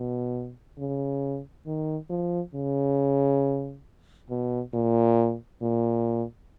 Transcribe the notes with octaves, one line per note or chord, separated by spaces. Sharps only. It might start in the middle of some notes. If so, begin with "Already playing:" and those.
Already playing: B2
C#3
D#3
F3
C#3
B2
A#2
A#2